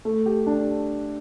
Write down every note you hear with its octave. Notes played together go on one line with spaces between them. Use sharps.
A3
G4
D4